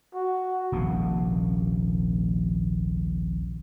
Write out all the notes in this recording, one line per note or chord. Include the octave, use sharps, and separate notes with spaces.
F#4
D#1 A#1 C3 A#3